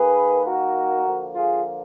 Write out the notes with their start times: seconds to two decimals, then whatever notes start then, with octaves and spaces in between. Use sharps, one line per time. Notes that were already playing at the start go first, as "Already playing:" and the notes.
Already playing: D#3 A#3 G#4 B4
0.46 F#4 A#4
1.05 D3 F3 A#3
1.34 F4 G#4